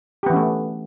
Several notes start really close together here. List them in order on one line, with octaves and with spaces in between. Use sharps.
G4 B3 E3 C#4 A3